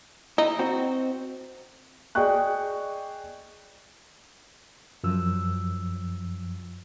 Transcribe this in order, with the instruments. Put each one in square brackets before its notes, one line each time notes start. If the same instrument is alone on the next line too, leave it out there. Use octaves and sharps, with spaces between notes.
[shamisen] D#4 [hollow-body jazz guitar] E4
[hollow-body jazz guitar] C4 F#4
[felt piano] G#4 D5 D#5 G5 C#6 F#6
[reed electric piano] F#2 F3 E6